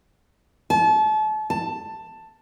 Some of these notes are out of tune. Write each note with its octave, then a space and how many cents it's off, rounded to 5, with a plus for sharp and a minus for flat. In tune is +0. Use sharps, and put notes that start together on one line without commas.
A5 -35
A5 +10